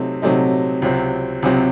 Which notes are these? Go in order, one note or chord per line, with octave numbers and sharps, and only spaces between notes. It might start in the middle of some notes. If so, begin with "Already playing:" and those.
Already playing: C3 F#3 A3 C4 D#4
C3 F#3 A3 C4 D#4
C#2 C3 F#3 C4
C#2 C3 F#3 C4